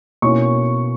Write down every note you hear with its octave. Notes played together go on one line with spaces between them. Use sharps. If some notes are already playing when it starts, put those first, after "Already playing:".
B2 A#3 C#4 E4 C#6